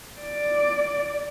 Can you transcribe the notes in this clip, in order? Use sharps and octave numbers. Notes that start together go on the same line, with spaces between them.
D5